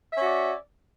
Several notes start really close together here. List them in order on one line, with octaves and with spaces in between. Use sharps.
E5 C#4 F#4 D5